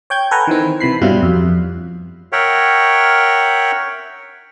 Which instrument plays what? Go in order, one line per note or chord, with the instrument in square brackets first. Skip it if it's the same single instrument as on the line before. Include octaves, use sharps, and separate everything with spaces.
[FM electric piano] C#5 G5 G6 G#6
A4 B4 F#5 G#5 A#5
D#3 E3 C4
C3 E3 B5 C7
G2 B2 F#3 G3 E4 F4
F2
[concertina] A#4 C#5 E5 F#5 G5